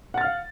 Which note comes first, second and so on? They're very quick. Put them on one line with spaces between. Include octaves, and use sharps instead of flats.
F#5 A6 F6 F5